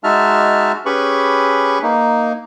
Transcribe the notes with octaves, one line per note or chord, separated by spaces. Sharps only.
G#3 D#4 F#4 E5 A5 F6
C#4 G4 G#4 B4 B5 C#6
A#3 D#4